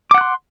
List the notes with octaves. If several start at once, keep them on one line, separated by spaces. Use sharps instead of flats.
F#5 C6 D6 F#6